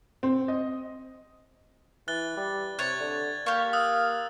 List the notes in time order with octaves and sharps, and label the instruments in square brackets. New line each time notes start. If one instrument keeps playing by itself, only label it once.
[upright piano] C4
D#5
[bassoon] E3 [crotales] F#6 A6 G7
[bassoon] G3
[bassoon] C3 [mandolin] C#5 [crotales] F#6 G#6 A6
[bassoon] D3
[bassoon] A#3 [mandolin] G4 C#6 [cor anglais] F5
[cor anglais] F5 [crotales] D#6 E6 F#6